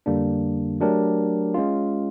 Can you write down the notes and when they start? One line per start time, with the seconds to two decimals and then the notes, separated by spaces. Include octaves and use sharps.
0.06 F2 D3 G3 A#3 D4
0.80 F#3 A3 D4 G4 A#4
1.54 G#3 C#4 F4